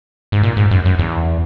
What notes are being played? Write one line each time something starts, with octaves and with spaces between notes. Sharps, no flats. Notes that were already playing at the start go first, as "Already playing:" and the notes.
G#2
A#2
G#2
F#2
F#2
E2